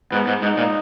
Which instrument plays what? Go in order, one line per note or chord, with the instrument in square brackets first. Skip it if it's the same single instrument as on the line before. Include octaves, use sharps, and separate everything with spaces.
[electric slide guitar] G#2 [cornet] B3
[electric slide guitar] G#2
[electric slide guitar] G#2 [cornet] D#4
[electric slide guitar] A#2